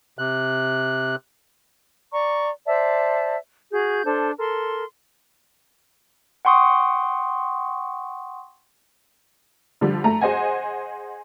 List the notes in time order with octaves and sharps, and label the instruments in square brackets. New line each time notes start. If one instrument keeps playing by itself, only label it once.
[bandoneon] C3 F#6
[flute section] D5 A#5 C#6
C5 D5 E5 A5
F#4 G#4 G6
D4 A4 C5
A4 A#4 C6
[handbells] F#5 G5 C6 C#6 D#6
[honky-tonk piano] D3 F3 G3
A3 A#5
G#4 C5 D#5 F#5 G#5